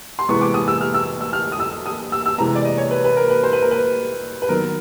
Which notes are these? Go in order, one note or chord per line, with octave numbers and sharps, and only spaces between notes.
C6
C3 E3 G#3 B3 C#6
D6
D#6
E6
F6
E6
E6
F6
D#6
E6
D#6
E6
E6
C3 E3 G#3 B3 A#5
D5
D#5
C#5
B4
B4
A#4
B4
C5
B4
A#4
B4
B4
D#3 F#3 B3 A#4